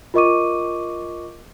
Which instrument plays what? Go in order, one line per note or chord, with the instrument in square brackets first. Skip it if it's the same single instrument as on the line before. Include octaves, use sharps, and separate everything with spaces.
[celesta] F4 A#4 D#5 C#6 D6 D#7